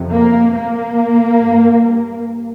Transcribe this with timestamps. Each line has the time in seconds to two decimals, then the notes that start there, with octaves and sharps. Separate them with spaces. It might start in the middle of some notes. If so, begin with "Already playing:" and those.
Already playing: F2 C3
0.11 A#3
0.54 A#3
1.40 G2